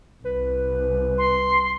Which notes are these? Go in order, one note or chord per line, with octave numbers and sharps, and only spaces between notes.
C2 B4
C6